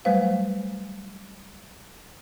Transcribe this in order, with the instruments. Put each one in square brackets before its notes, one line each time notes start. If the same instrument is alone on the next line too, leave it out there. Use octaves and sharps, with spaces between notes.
[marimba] F#3 G3 A3 B4 C5 F5